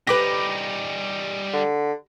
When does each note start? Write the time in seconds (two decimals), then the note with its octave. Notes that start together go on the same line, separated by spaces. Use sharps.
0.07 G3 D#4 G4 B4 D6 A#6
1.53 D3